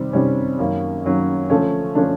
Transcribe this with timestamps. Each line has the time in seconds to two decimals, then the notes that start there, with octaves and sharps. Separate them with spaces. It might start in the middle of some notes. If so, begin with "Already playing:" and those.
Already playing: C3 D#3 G3 C4
0.13 C3 D#3 G3 C4 C#4
0.58 F#2 D#3 F#3 A#3 C#4
1.04 F#2 D#3 F#3 A#3 C#4
1.50 D3 F3 A3 C#4
1.95 D3 F3 A3 C#4 D4